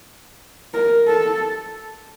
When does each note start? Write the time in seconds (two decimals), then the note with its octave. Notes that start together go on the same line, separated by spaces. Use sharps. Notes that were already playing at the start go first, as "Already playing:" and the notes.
0.74 A#4
1.08 A4